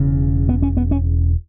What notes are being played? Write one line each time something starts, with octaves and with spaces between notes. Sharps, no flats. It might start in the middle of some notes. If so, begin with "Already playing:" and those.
Already playing: E1 E2 C#3
B3
C#4
B3
C#4